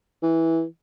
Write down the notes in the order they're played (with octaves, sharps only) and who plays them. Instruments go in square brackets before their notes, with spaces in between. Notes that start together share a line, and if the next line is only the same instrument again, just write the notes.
[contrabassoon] E3